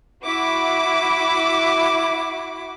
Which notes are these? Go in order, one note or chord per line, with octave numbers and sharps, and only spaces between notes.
E4 F#4 D6